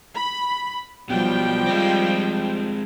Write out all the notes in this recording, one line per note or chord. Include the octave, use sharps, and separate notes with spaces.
B5
B1 B2 F3 G3 G5
G#3 C4